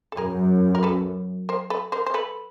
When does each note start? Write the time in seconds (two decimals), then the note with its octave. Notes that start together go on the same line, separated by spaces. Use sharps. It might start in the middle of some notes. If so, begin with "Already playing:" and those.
0.12 A4
0.17 F#2 G#4 A#4
0.75 A#4
0.83 A4 B4
1.49 A#4 C5
1.70 A4 B4
1.92 A#4 C5
2.06 C5
2.14 A4 B4